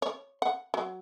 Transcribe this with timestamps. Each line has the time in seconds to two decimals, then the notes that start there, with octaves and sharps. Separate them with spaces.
0.02 C#5
0.42 F#5
0.74 F#3